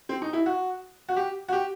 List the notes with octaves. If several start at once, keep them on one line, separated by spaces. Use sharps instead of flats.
C4
D#4
E4
F#4
F#4
G4
F#4
G4